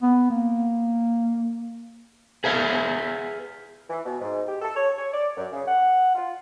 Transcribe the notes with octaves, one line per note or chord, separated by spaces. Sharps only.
B3
A#3
G#4 B4 E5 F5 G#5
E3
B2
G#2
G4
A4
C#5
C#5
D5
F#2
C#3
F#5
F4